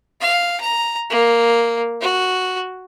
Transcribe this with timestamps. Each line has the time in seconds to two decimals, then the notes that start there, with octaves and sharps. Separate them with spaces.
0.21 F5
0.60 A#5
1.10 A#3
2.01 F#4